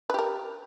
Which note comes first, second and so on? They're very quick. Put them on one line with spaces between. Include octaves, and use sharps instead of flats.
B4 G4 A#4